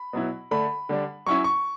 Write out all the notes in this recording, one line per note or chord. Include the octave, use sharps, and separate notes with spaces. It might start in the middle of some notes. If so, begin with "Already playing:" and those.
Already playing: B5
B2 F#3 B3 E4
D3 A3 D4 B5
D3 G3 D4
F#3 C#4 E4 C#6
C#6